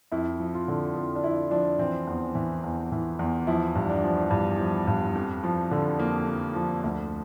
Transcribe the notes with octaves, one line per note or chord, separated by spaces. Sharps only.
F2 E4
F3
F4
D3
F2 F4
D4
F2 E4
F3 D4
E3 C4
E2
E3
E2
E3
E2
F3 E4
G2
D4
F3
G2
F3
G2
F2
F3
D3
F2 A#3
F2
F3
D2